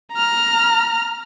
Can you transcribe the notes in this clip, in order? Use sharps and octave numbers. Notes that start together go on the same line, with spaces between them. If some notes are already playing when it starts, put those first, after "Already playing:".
A#5 F6